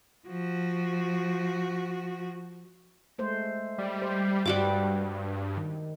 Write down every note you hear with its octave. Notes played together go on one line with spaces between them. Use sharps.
F3 F#4
G#3 A3 C5
G3
C5
G2 G3 F#4 D6
D#3